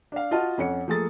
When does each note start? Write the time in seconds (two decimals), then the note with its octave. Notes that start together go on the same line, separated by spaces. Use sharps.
0.12 D4 F5
0.31 F4 F#4 D#5 F5 F#5 A5
0.58 F2 C#4 F#5 C#7
0.88 F3 A3 A#3 G#4 A4 A6